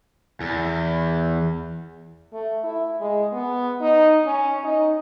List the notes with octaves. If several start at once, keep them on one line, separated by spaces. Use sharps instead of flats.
E2
A3
E4
G#3
B3
D#4
C#4
D#4